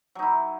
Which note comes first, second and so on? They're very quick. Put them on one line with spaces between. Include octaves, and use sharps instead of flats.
F#3 D#4 E4